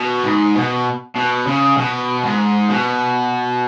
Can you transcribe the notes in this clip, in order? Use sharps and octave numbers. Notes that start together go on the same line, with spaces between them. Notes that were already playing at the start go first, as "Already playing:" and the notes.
Already playing: B2
G#2
B2
B2
C#3
B2
G#2
B2